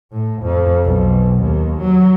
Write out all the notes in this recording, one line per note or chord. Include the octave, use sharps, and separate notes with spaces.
A2
F2
B1
D#2
F#3